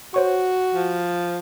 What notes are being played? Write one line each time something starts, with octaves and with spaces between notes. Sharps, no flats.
F#4 C5 C#5 C#6
F3